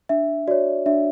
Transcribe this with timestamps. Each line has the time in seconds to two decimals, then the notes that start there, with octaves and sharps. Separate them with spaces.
0.09 D4 E5
0.47 F#4 C#5 D5
0.86 D4 E5